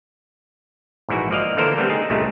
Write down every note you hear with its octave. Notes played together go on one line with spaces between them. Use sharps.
A#1 G#2 E3 E4 F#4
F3 A#3 D5 D#5 F5
D3 E3 A#3 A4 A#4 C5
D3 G3 A3 B3 C4
D#4 G#4
C#2 G2 A#2 C#3 A3